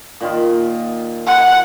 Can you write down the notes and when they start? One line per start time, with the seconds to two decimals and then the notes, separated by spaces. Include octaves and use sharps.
0.20 A#2 D#3 F4
1.27 F#5